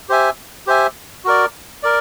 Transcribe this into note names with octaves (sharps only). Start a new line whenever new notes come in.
G4 C5 E5 G#5
G4 C5 E5 G#5
F#4 A#4 D5
A#4 D5